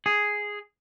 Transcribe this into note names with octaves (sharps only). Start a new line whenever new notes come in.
G#4